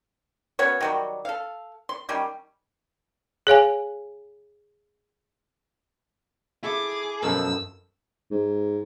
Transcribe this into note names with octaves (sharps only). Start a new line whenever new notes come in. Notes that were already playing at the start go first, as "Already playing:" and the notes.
B3 C#4 F#4 C#5
D#3 F#3 G3
A4 F5
C6
D#3 G3 C#4
G#4 C#5 F5 G#5
E4 G#4 A4 D6
F#2 B2 F3 A4 A#4 E6
G#2